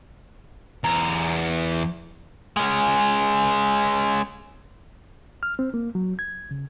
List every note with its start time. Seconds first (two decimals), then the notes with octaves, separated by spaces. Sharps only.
0.84 E2 A#5
2.57 G#3 C#4
5.43 F6
5.59 C4
5.74 A#3
5.95 F#3
6.19 G#6
6.51 C#3